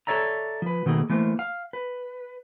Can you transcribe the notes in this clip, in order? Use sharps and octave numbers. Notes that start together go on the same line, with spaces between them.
A4 B4 C#5 D5 E5 A#5
F3 B4
B2 D#3 A3 A#3 G#4
E3 A3 A#3 C5
F5
B4